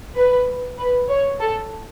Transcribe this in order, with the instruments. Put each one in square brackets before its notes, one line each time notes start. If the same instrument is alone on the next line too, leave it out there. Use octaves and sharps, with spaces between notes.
[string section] B4
B4
C#5
A4